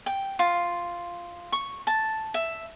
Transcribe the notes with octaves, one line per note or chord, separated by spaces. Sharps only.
G5
F4
C#6
A5
E5